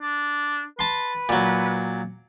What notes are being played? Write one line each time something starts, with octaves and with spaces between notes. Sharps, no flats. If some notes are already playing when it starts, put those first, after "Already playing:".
D4
B4 A5 C6
A#2 F#3